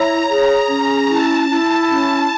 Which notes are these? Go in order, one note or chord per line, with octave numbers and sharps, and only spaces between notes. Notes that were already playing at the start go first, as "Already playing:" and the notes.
Already playing: E4 C#5 A#5
G#4
C#4
E4 A5
E4 A5
C#4 A5